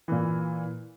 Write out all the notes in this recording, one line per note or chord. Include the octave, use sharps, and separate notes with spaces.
A#2 E3